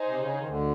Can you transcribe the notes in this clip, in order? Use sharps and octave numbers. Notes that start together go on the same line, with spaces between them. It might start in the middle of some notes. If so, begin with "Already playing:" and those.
Already playing: D#4 G#4 C5
C3
C#3
D#3
D2 D3